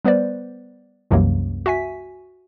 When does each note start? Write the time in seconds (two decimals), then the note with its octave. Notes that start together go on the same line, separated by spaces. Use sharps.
0.05 G3 B3 B4 C5 D5
1.11 C2 F#2 C3 E3 F#3 A#3
1.66 F#4 E5 G#5 B6